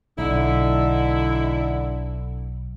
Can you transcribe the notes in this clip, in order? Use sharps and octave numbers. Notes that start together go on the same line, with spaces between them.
B1 D3 D#4 E4